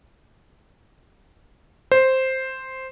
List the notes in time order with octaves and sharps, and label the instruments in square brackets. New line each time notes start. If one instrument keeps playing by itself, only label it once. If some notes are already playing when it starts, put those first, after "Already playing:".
[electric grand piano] C5